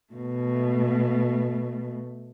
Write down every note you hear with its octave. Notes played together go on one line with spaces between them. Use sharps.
B2 A3